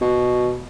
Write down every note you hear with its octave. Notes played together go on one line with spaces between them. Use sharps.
B2